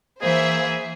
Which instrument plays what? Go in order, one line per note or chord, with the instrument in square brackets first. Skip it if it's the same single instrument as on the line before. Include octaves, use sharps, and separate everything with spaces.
[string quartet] E3 A#3 [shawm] G#4 [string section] C5 E5